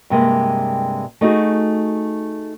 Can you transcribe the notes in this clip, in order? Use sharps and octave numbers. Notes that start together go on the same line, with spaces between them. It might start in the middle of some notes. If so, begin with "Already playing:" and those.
G2 C3 G#3 A#3
A3 D#4 F#4 G#4